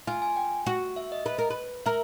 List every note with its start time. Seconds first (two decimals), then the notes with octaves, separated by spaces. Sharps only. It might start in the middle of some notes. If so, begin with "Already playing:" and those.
0.07 F4 G#5
0.22 G#5
0.36 G5
0.66 F#4
0.96 E5
1.12 D#5
1.26 B4
1.39 A#4
1.50 B4
1.86 A#4 E5